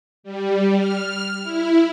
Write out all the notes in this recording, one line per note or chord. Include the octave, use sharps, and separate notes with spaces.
G3
F6
E4